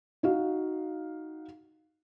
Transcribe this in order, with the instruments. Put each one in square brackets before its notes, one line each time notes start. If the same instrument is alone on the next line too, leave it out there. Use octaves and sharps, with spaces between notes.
[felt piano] D#4 F#4 F5